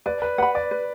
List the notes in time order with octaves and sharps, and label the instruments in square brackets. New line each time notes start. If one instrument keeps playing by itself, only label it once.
[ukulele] B4 [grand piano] D5
[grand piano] B4
[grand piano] B4 [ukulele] F#5 B5
[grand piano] D5
[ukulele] B4